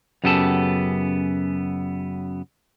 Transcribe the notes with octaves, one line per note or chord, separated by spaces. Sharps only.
F#2 C#3 B3 G4 A4 A5